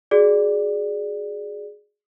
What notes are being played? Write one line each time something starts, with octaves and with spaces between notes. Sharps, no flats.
F#4 G#4 D5